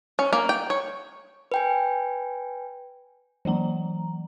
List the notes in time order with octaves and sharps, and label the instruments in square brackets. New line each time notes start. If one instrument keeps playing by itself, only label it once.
[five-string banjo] C#4
A#3
G5
C#5
[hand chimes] B4 G5 G#5
[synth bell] E3 F#3 A#3 A#5